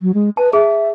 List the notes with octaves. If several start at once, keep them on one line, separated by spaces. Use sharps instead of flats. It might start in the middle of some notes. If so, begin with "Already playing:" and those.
F#3
G#3
B4 A5
G#4 E5